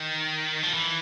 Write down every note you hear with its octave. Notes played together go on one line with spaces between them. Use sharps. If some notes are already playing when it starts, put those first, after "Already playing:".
Already playing: D#3
F3
E3